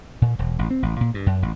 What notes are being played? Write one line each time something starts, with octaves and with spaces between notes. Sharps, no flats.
A#2
E1
A1
C4
A1
A#2
G2
F#2
A1